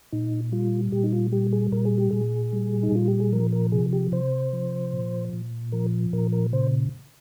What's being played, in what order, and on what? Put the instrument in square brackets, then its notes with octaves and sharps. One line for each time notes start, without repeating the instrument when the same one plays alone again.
[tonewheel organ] A#2 D#4
G3 F4
A#2 G4
D#4
F4
G3 G4
G#4
A#2 A#4
G#4
G4
A#2 G#4
G3
D#4
A#2 F4
G4
G#4
F3 A#4
A#4
C3 G#4
G4
C3 C5
F3
A#2
A#2
F3 A#4
A#2 A#4
A#4
C#3 C5